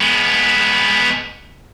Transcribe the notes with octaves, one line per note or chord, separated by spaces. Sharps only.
G#3 B3